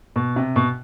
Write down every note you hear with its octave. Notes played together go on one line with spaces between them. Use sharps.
B2
C3
B2